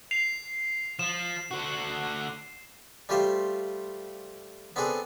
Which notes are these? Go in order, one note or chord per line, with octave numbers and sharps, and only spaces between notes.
C7 F7
F3 E7
D3 F#4
G3 A3 F4 G4 C5
B3 C4 D4 G#4 A4